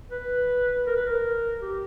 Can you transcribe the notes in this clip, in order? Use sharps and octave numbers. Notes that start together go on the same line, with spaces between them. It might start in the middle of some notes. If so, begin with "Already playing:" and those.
B4
A#4
B4
A#4
G4